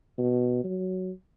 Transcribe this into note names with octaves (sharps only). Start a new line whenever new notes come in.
B2
F#3